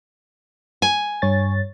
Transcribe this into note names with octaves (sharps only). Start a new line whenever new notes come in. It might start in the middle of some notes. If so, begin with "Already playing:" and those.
G#5
G2 C#5 A6